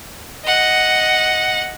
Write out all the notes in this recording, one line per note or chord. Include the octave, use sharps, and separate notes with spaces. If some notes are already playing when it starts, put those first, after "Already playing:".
D#5 F#5